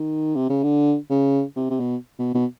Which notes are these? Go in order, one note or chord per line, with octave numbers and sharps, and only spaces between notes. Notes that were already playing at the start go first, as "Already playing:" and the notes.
Already playing: D#3
C3
C#3
D3
C#3
C3
C3
B2
B2
B2